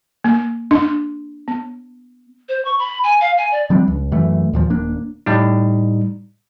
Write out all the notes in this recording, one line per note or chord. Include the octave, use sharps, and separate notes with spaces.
A#3
D4
B3
C5
C#6
B5
G#5
F5
G#5
D5
F3 G3 C4 D4
C#2
F#2 E3 A3
D#2 A#2 F3
D#1 A#3 D4
A2 G3 D#4